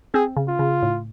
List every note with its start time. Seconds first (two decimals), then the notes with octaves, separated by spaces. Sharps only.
0.14 C4 G#4
0.37 C#3
0.48 F4
0.59 C#3
0.83 A2